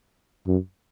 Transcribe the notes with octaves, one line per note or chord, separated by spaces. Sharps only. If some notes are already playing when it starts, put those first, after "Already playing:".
F#2